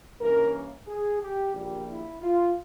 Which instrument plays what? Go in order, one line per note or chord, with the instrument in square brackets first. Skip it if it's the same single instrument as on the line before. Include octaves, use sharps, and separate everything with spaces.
[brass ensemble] G2 E3 A#3 C#4 A#4
G#4
G4
A#1 A#2 G3 A#3 G4
E4
F4